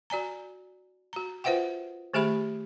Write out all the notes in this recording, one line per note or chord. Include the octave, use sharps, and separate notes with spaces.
F#4 D5 G#5 A#5
F#4 A#5
F4 B4 C5 E5 F#5 G5
D#3 A3 G4 G#4 E5 B5